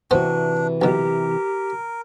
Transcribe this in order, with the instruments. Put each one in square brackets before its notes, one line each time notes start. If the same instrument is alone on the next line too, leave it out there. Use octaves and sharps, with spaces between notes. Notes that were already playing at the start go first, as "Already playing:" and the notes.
[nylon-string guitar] C3 E3 F#4 [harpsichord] B3 C5 [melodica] D4
[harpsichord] B1 B2 [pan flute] G4 [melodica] A#4